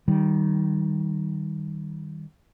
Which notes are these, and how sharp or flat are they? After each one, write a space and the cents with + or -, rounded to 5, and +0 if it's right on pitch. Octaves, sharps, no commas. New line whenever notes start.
D#3 +0 G3 -15